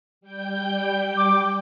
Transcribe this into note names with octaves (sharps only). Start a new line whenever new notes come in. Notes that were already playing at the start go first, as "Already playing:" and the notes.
G3 G5 G6
D6